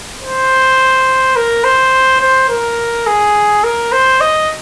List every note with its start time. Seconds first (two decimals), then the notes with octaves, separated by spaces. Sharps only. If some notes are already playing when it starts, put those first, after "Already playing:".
0.22 C5
1.36 A#4
1.64 C5
2.20 C5
2.49 A#4
3.06 G#4
3.64 A#4
3.92 C5
4.20 D#5